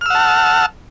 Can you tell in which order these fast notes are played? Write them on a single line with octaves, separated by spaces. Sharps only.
F6 E6 F#5 A5